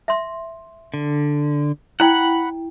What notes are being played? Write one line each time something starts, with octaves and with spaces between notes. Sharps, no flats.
E5 C6
D3
E4 D5 F#5 G5 B5